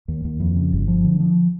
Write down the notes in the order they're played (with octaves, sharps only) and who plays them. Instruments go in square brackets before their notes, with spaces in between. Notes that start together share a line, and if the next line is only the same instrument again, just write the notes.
[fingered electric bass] D#2
D#2
F2
C#3
G1
F3
D3
F3